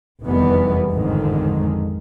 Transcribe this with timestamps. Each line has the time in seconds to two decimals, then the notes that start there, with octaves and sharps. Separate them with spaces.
0.23 F1 E2 D#3 E3 G3 B3
0.91 A1 F2 G#2 D3 D#3 G#3